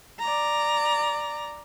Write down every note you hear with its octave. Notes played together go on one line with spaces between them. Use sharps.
D5 A#5